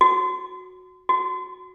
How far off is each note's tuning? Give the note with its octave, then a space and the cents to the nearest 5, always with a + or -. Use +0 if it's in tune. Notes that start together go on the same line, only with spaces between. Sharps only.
F#4 -10
F#4 -10